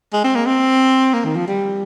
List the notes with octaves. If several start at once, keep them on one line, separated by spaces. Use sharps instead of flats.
G#3
C4
A#3
C4
A#3
D#3
F3
G3